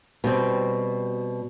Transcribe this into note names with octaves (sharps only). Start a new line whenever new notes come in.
B2 G3 C4